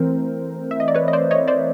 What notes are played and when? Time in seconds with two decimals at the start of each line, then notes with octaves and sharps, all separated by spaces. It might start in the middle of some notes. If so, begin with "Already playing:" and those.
Already playing: E3 A3 C4 A#4 C5
0.71 E5
0.80 D#5
0.88 D5
0.95 B4 C#5
1.08 D#5
1.13 C5 D5
1.31 C#5 D#5
1.48 C5 D5